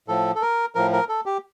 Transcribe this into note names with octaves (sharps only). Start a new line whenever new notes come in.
A2 F3 A4
A4
A#4
A2 F3 A#4
A#4
A4
G4